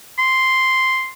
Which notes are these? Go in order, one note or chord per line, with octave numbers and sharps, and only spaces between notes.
C6